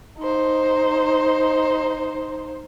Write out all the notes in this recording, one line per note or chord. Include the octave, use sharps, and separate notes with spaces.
D#4 C5